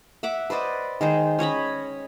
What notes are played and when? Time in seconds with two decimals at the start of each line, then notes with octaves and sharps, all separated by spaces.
0.23 E5 F#5 D6
0.50 B4 C5 D5 D#5
1.01 D#3 G#3 C5
1.39 C#4 C#5 D#5 B5